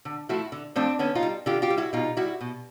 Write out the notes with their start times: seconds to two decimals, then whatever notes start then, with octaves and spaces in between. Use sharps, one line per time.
0.05 D3
0.29 F3 A3 E4 F#4
0.52 D3
0.76 F3 A3 C4 D4
0.99 D3 B3 C#4
1.15 D#4 F4
1.23 G3
1.46 D3 F4 G4
1.62 F4 G4
1.70 G3
1.78 E4 F#4
1.93 B2 D#4 F4
2.17 G3 E4 F#4
2.41 B2